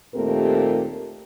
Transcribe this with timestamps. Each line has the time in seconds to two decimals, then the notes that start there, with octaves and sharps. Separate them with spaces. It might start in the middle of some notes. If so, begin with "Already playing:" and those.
0.15 D#2 A#2 A3 C4 G4 A#4